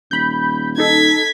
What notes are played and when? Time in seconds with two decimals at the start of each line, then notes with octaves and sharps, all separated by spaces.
0.11 D#1 B5 G6
0.78 D#4 A4 G#6 B6